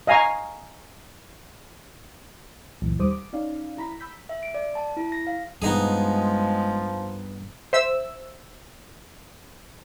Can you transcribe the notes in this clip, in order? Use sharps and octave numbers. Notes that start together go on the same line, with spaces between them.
D#5 F5 G#5 A#5 C#6
C#2 F#2 A#2 E3
D#2 D#3 G3 C5 D6 D#6
D6
C#4 D#4 D5 F5
E4 A#5 B5 B6
B5 E6 G6 B6
E5
D7
D5
A5
E4
A#6
F5
G2 F3 G#3 B3 D#4 G#4
C5 E5 E6